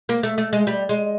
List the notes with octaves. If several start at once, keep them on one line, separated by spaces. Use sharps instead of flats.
A#3
A3
A3
G#3
G3
G#3